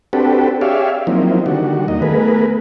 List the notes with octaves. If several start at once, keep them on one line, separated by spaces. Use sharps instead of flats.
C4 D4 F#4 G4 A4 B4
G4 G#4 C#5 D5 E5 F5
F3 F#3 A#3 C4 D#4 E4
D3 D#3 G3 F#4
D#2 D#3 A#3 D#5
A3 B3 G#4 A#4 B4